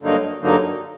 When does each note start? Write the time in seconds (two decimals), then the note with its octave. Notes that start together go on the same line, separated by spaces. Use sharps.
0.01 G2 D3 F#3 A#3 D#4
0.42 G2 D3 F#3 A#3 D#4